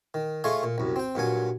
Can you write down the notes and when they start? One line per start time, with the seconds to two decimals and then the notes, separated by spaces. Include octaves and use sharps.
0.14 D#3
0.44 A3 F4 G#4 C#5 D#5 F5
0.63 A#2
0.78 C2 F#2
0.96 C4 G5
1.15 G2 A#2 F#3 G#5